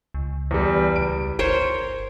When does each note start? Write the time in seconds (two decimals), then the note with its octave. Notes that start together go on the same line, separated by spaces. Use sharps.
0.14 C#2
0.51 E2 G3
0.96 C#2 D7
1.39 G1 A#4 C5 C#5